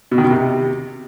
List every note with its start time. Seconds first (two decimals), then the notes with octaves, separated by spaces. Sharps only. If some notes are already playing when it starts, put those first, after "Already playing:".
0.12 B2
0.18 D#3
0.24 B2
0.31 C3